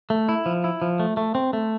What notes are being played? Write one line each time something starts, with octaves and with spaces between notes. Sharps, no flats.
A3
E4
F3
E4
F3
A3
A3
C4
A3